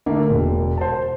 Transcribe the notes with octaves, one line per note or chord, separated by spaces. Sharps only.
D3 A3 A#3
E1
C5 A5